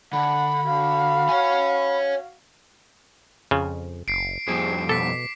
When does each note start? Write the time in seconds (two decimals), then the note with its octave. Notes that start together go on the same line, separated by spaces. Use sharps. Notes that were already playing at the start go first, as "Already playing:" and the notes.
0.13 D3 F#5 B5
0.65 F#4 F5
1.29 C#5 G#5
3.51 F2 C#3 F4
4.08 F#1 C7 D7
4.47 F2 G3 C4 G#4
4.89 B2 A4 D6 B6